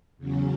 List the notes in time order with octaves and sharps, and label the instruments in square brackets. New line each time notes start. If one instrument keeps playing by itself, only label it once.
[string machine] E2 C#3 F#3 C#4